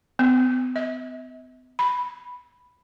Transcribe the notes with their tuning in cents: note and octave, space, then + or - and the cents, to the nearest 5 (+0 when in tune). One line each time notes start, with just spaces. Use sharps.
B3 +45
E5 -45
B5 +0